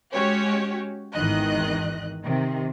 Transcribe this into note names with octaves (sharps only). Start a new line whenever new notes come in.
G#3 C#4 F#4 G4 C#5
G#1 E2 D#3 E3 D#5 F#6
C3 D#3